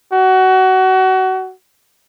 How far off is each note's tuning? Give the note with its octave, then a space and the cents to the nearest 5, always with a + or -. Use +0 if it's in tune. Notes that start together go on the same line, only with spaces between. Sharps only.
F#4 +25